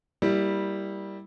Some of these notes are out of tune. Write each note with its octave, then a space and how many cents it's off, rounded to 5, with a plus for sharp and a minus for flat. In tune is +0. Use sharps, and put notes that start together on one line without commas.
G3 +0 A#3 +0 E4 -20